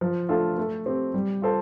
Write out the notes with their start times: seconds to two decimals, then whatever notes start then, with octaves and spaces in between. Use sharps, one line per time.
0.01 F3
0.29 A3 D4 F4 A4
0.58 A3
0.86 C4 G4
1.14 G3
1.42 F4 A4 C5